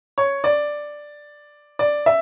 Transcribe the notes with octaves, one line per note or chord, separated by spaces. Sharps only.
C#5
D5
D5
E5